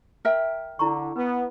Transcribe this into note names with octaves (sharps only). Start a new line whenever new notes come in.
A#4 E5 G5
D3 E4 A#5 C#6
B3 B4